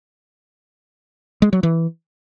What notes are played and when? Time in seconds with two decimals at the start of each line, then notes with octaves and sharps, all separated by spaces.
1.42 G#3
1.53 F#3
1.63 E3